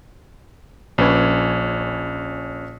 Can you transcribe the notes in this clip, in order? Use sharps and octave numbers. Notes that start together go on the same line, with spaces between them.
A#1 C#4 B4 C#5